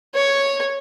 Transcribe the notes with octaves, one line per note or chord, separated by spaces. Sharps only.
C#5